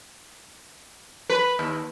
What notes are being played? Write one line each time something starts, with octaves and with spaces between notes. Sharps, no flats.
B4
D#2